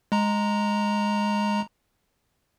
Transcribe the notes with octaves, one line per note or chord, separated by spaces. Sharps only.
G#3 A#5